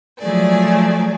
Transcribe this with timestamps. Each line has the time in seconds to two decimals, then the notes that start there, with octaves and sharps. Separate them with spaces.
0.20 F3 F#3 A3 G#4 D5